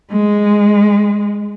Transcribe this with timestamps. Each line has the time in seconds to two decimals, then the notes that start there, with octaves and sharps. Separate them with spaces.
0.12 G#3